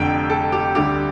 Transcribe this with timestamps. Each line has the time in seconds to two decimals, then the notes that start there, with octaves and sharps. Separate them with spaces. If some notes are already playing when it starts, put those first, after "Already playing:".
Already playing: F1 F2 D3 G5
0.30 A4
0.52 G4
0.75 D2 D3 G3 G4